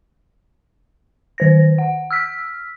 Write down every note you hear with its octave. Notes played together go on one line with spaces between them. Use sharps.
D#3 C5 A#6
F#5
E6 F6 B6